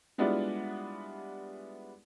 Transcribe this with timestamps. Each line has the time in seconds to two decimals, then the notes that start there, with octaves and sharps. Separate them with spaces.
0.18 G3 G#3 B3 D4 E4 F4